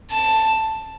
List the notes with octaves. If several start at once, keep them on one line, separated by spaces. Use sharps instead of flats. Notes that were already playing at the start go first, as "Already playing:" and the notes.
A5